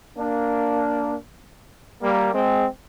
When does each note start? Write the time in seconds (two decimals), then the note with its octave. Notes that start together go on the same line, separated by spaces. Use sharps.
0.18 A#3 D4
2.03 G3 A#3
2.33 G#3 C4